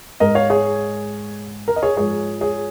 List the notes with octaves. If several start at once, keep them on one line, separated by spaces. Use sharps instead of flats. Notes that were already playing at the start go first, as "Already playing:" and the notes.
G#2 G#3 A#4 D#5
C#5 F5
G#4 C#5
A#4
D#5
G#4 C#5
G#2 F3 G#3 G#4 C#5
G#4 C#5